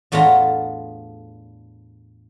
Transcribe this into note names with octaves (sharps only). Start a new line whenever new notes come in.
E2 A2 B3 D4 F4 A#5